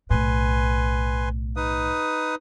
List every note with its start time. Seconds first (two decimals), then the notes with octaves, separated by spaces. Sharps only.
0.10 B1 A2 B4 G#5 C6
1.56 D#4 B4 D#6